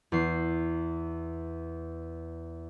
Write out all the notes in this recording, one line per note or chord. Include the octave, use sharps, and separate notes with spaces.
E2 C7